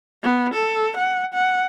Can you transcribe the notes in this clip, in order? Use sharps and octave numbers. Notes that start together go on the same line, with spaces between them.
B3
A4
F#5
F#5